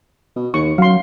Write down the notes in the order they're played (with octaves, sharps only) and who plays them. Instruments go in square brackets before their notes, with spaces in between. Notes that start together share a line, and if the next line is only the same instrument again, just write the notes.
[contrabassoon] B2
[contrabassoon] D#2 [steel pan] C#6
[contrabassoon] F#2 [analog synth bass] F#3 [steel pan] F5 C6